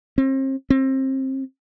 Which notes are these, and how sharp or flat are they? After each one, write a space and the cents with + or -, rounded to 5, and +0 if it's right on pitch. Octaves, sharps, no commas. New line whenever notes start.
C4 +40
C4 +25